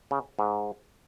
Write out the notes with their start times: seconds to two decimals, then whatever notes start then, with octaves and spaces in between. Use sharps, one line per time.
0.11 C#3
0.39 G#2